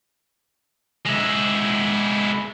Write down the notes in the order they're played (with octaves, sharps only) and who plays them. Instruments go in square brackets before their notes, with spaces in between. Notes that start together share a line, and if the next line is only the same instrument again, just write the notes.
[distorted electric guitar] G#3 E4